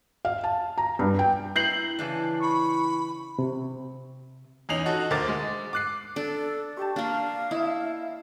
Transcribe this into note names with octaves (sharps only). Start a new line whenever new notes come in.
F5
A5
A#5
G2
G5
E4 A#5 G6 C7 F#7
C#3 E3 D4
B5 C#6
C3
E2 C#4 D#4 C7 F7 F#7
D#4 F#4 A4
D2 A#4 C5 D6 A6
G#3
D6 F#6 C7
D4 A4
G4 A5 C#6
A#3 D4 F5
E4 D#5 E5